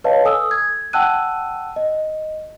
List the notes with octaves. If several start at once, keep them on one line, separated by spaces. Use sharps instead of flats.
B4 C#5 D#5 F5 A5
A4 G#5 D#6 E6
G#6
F#5 G5 A5 E6 F#6 D#7
D#5